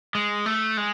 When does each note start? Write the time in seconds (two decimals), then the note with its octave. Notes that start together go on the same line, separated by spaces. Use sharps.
0.15 G#3
0.46 A3
0.77 G#3